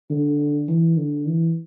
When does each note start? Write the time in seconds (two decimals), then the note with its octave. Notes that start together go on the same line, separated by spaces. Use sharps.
0.10 D3
0.68 E3
0.97 D3
1.27 E3